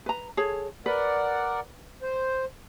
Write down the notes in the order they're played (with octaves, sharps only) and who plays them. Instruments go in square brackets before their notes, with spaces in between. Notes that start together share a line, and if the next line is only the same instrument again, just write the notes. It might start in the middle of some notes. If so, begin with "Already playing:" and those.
[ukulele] B4 A#5
G#4 A4 C#5
[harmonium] A#4 D5 F#5 [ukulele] B4
[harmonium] C5